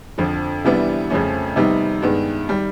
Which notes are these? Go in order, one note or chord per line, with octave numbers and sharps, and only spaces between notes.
F2 D3 F3
C3 E3 G3 B3 D4
F2 C#3 F3 A3 C#4
C3 D#3 G3 B3 D#4
G2 D#3 G#3 B3
D#3 G3